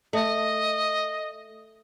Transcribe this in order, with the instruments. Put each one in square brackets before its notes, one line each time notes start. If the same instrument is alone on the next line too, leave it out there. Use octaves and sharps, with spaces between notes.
[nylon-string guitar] A3 [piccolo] D#5